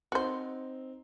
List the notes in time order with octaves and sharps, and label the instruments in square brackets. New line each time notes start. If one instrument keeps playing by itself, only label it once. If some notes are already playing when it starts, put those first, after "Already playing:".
[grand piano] C4 D#4 [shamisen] F#4 C5